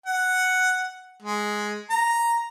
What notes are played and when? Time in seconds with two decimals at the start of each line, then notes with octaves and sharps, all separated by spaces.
0.06 F#5
1.22 G#3
1.90 A#5